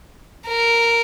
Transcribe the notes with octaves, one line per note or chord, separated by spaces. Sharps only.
A#4